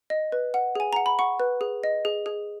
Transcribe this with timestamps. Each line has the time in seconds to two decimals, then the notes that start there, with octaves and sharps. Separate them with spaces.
0.10 D#5
0.32 B4
0.54 F#5
0.75 G#4 G#5
0.93 F#5 A#5
1.06 B5
1.19 F#5 C#6
1.40 B4
1.61 G#4
1.84 D#5
2.05 G#4
2.26 G#4